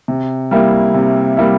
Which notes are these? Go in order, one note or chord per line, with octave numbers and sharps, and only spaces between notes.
C3
G3 A#3 E4
C3
G3 A#3 E4